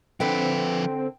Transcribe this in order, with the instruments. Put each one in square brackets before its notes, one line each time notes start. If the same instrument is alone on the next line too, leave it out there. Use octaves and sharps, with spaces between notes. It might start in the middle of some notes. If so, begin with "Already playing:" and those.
[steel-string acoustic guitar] D3 A4 F#5 [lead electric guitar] F3 B4 [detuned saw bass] C4 [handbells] G5